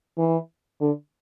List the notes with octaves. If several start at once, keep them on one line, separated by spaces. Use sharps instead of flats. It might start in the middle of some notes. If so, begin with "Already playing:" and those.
E3
D3